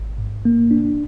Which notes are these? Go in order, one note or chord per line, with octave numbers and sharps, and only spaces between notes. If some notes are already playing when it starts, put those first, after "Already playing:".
Already playing: G#1
G#2
A#3
D4